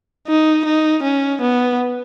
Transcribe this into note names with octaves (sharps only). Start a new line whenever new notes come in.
D#4
D#4
C#4
B3